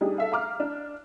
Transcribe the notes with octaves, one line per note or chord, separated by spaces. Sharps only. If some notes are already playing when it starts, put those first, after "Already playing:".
G3 D4 D#4 G#4
A4 E5 F5
F5 A#5 D6 F6
D4